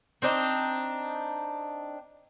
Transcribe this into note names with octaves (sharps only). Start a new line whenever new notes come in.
C4 D4 D#4